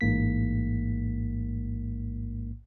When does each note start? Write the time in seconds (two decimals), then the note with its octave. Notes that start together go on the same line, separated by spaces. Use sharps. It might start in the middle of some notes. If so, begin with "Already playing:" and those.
0.01 A1 G#2 A#3 B6